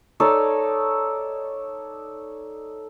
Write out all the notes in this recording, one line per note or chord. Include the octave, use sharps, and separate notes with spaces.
D#4 A4 C#5 D5